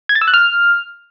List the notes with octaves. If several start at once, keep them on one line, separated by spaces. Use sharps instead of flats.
G#6
A6
E6
F#6
F6